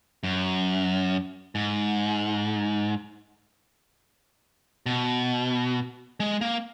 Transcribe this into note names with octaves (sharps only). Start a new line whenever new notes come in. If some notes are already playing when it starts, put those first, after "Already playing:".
F#2
G#2
B2
G#3
A#3